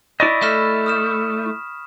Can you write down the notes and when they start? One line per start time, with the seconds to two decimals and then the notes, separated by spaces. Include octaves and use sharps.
0.20 E4 D5 D#5 B5 C#6
0.42 A3 F6 B6 E7
0.86 D#6 F6 E7